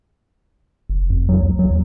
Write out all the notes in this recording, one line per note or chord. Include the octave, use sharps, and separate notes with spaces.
F#1
F2
F#3
C#2
F#3
D#2